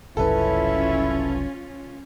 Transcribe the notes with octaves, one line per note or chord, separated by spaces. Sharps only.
F#1 C2 F#2 C#4 E4 F4 A4 B4